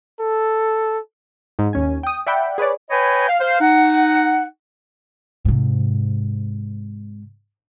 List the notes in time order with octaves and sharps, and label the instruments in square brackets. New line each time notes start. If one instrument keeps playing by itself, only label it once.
[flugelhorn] A4
[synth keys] G#2
D#2 C#4 G#5
G5 D#6
D5 E5 F#5 G5 B5
G#4 B4 C#5 D5
[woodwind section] B4 C#5 D#5 G5 G#5 B5
F5
C5 F5
D#4 F#5
[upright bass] G#2 C3